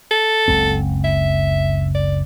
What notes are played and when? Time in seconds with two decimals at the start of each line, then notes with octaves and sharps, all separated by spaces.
0.11 A4
0.48 F#1 C#2 C4
1.04 E5
1.95 D5